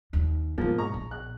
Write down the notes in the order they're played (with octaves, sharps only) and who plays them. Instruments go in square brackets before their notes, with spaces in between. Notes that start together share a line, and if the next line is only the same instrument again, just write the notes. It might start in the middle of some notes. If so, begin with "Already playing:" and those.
[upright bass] D#2
[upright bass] G#2 B2 [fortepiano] F3 A#3
[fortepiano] A#5 C#6
[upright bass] A#1
[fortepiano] F#6